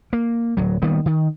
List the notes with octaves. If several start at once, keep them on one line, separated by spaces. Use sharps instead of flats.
A#3
D1 F#3
D#3 G3 A#3 B3
D#3